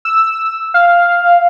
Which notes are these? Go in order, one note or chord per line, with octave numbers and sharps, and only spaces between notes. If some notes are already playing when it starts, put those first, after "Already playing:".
E6
F5